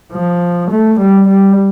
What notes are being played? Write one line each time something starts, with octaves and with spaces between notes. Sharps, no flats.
F3
A3
G3
G3